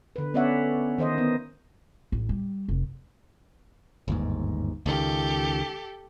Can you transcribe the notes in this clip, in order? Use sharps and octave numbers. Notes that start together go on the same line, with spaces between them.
D3 B4
B3 C#4 C#5 D5 E5 F#5
D#3 C5 D#5
B3
A1
G3
F1
G1 D#2 G#2
C#2 D#3 G4 A4